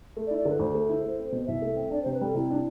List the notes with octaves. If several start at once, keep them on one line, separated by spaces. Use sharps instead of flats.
A3
D5
E4
D5
D3 B4
D2 C5
A3
E4
A3
C4
B2
C2 E5
A3
C4
D4 D5
C3 C5
B4
G3 A4
C3 E4
D4